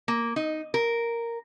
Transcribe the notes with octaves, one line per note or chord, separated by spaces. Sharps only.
A#3
D#4
A#4